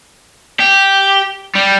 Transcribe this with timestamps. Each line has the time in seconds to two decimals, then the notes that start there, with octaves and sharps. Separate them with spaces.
0.60 G4
1.56 G3